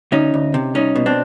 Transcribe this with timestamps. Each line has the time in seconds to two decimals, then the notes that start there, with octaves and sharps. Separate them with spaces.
0.12 D2 C#4 D#4
0.34 D2
0.54 C3
0.75 C2 C#4 D#4
0.95 B2
1.06 C4 D4